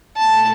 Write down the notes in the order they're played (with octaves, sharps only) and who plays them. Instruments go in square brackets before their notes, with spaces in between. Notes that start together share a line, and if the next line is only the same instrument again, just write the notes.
[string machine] B2 A3 E4 A4 [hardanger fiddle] A5